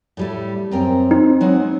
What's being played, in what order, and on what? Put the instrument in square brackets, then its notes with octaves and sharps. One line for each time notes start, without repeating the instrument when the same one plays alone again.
[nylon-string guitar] A2 G3 A3
[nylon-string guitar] F#2 A#4 G5 [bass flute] C4
[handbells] D#4
[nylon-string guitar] F#3 G#3 B3